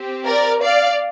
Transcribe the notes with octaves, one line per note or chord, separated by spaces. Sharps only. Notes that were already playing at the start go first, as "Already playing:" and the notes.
Already playing: C4 G4
A#4 D5
D5 F5